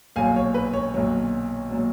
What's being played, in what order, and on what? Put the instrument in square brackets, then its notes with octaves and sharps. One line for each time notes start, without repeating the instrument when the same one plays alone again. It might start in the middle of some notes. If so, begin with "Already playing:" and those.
[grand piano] B1 A#2 F#3 F5 G#5
C#5
B4
C#5
B1 A#2 F#3
A#2 F#3